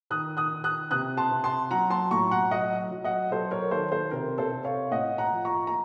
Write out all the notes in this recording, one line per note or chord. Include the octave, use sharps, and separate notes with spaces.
D#3 D#6 F#6
D#6 F#6
D#3
D#6 F#6
C3 D#6 F#6
A5 C6
C3
A5 C6
F#3 F#5 A#5
A5 C6
A2 A#5 C#6
F#5 A#5
F#3 D#5 F#5
F#3
D#5 F#5
F#3 A4 C5
A#4 C#5
D#3 A4 C5
A4 C5
C3 A#4
A4 C5
C3
C#5 F5
A2 D#5 F#5
F#5 A#5
F3
A#5 C#6
A#5